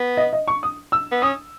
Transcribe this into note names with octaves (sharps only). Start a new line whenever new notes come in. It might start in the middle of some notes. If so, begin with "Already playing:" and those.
Already playing: B3
D#5
D#5
C#6
D#6
E6
B3
C#4 D#6